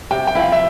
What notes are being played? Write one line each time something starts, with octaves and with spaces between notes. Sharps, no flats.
C3 G5
G5
F3 C4 E4
F5
E5